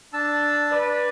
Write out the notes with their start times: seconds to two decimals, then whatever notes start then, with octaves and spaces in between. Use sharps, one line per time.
0.13 D4 A5 E6
0.71 B4 D5